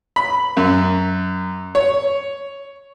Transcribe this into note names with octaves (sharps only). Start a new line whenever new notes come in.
B5
F#2
C#5